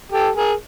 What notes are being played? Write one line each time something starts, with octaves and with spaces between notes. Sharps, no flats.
G4 A4
G#4 A#4